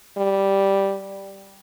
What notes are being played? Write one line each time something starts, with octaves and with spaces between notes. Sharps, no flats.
G3